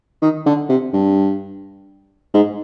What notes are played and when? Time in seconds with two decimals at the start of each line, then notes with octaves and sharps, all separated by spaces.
0.22 D#3
0.46 D3
0.69 C3
0.93 G2
2.34 G#2